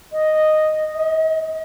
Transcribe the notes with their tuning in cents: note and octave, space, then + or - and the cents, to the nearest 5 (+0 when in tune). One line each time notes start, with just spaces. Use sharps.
D#5 -5
D#5 +40